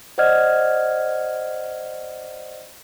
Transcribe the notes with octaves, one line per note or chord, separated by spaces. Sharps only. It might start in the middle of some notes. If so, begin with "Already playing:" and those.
C5 D5 D#5 F#5 F6 G#6